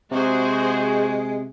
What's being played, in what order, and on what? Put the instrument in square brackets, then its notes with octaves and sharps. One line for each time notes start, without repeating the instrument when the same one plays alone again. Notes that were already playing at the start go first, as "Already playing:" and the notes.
[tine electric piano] C3 [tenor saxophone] G#3 [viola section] F#4 G#4 C5